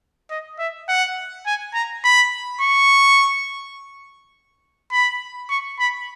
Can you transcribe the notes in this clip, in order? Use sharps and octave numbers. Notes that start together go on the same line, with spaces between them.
D#5
E5
F#5
G#5
A#5
B5
C#6
B5
C#6
B5